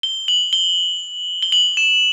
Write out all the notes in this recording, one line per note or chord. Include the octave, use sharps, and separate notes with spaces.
G7
F#7
G7
G7
F#7
E7